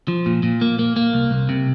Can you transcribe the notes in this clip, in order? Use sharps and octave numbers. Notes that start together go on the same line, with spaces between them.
F3
A#2
A#2
A#3
A#3
A#3
C2
C2
C3